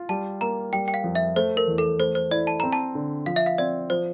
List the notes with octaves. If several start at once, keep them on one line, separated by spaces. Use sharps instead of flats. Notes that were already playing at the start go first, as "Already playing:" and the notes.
Already playing: F4
G3 A5
A#3 A#5
G3 G5
G5
F5
F2
E5
A3 C5
A#4
E2
A4
A3 C5
C5
E4 D5
A5
C4 A#5
A5
D3
F3 F5
E5
F5
C4 D5
F3 C5